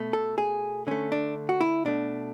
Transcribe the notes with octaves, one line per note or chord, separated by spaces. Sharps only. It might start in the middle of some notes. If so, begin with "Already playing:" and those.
Already playing: B2 A3
A4
G#4
D3 A3 C#4
D4
F#4
E4
B2 A3 D4